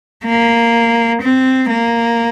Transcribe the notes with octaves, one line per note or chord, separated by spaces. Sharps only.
A#3
C4
A#3